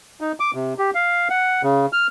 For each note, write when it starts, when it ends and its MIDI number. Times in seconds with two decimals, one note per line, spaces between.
0.21 0.32 63
0.40 0.51 86
0.54 0.73 48
0.78 0.90 67
0.94 1.28 77
1.30 1.62 78
1.63 1.86 49
1.93 2.07 89